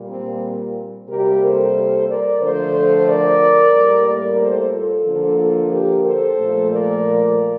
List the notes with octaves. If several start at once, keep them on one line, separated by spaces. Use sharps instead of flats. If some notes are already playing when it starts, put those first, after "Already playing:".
Already playing: A#2 G3 A#3
C4
C3 G3 A#3 G4 A#4
A4 C5
A#4 D5
D3 F3 A3 A4 C5
A#4 D5
A2 G3 A#3
A#4 D5
A4 C5
F4 A4
D3 F3 A#3
F4 A4
G4 A#4
A4 C5
A#2 F3 A3
A#4 D5